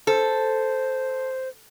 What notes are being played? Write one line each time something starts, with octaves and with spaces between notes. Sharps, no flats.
A4 C5